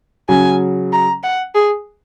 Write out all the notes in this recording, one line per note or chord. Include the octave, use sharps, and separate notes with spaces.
C#3 F#3 G#5
A#5
F#5
G#4